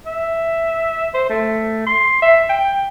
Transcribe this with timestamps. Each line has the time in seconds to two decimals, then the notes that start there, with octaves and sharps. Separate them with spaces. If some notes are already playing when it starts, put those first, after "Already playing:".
0.06 E5
1.14 C5
1.30 A3
1.87 C6
2.22 E5
2.50 G5